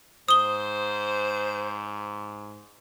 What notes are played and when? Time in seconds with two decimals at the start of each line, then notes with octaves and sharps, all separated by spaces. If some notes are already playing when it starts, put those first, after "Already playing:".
0.29 G#2 C5 D#6 G7